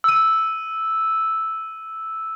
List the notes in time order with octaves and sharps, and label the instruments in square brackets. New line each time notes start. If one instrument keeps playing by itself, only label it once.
[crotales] E6 D#7